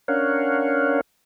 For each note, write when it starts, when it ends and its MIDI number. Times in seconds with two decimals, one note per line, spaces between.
0.08 1.01 61
0.08 1.01 62
0.08 1.01 70
0.08 1.01 73
0.08 1.01 77
0.08 1.01 78